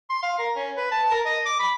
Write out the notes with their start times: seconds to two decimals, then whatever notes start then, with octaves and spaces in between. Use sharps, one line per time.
0.10 C6
0.23 F5
0.39 A#4
0.55 C#4
0.77 B4
0.91 A5
1.11 A#4
1.26 D#5
1.45 D6
1.59 B5